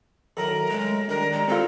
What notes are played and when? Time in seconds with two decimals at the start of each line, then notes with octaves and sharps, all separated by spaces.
0.37 D#3 F#3 E4 A4 A#4 A#5
0.70 C#3 G#3 A3
1.09 D#3 G3 D4 A#4
1.32 G#3 A#5
1.48 C4 F4 A4